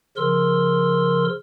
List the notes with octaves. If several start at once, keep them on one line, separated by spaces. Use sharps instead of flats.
C#3 F3 A#4 C6 E6